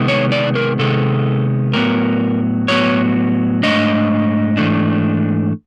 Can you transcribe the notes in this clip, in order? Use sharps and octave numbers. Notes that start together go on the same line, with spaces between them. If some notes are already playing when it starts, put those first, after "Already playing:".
Already playing: C3 D#3 G#3 B3
C#5
D5
A#4
C3 D#3 G#3 B3 A4
A2 F#3 B3 A#4
A2 F#3 B3 C#5
G#2 E3 A3 D4 D#5
G#2 E3 A3 D4